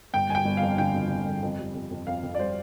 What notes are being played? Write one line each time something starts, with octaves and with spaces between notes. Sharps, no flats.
G1 G5
G1 G#5
G5
G1
F2 F5
D3 G5
F2
F2
G1
F2
G3
F2
F2
F2 F5
F2
D5
G3 C5